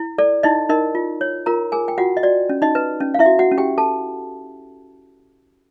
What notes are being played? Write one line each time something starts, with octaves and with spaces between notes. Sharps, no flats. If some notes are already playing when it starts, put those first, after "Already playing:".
Already playing: E4
A4 D5
D#4 E4 D#5
D#4 A#4 D#5
F4
C#5
F4 A#4 A#5
G#4 A#4 G#5
G5
F4 F#4 F#5
D#5
F#4 D5
C#4
D#4 D#5
B4
C#4
F5
E4 E5
F#4
F#4 F#5
C#4
G4 G5
A4 A5